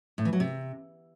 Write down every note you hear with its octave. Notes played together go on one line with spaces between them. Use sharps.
A2
E3
F#3
C3